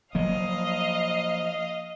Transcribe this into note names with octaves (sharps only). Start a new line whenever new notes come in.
F3 F#3 A#3 D#5 F5